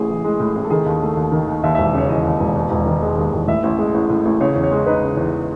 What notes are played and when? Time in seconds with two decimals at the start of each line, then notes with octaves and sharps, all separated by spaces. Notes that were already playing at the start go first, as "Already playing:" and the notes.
Already playing: A1 A2 G#4
0.09 E3
0.24 G#3
0.40 A2
0.55 A1
0.64 A4
0.70 D#3 G#4
0.86 D#2
1.02 A3
1.17 D#2
1.32 D#3
1.47 D#2
1.64 D#2 E5
1.75 E1 E5
1.94 C#3 C#5
2.09 E3 D#5
2.25 D#2
2.40 E1
2.55 D#2
2.71 E1
2.86 D#3
3.02 G#3
3.18 D#2
3.32 E1
3.48 A2 E5
3.63 A1
3.79 G#3
3.94 A1
4.10 A2
4.25 A1
4.41 C#3 C#5
4.56 E2
4.64 C#5
4.72 G#3
4.87 D#4 B4
5.03 C#3
5.17 E2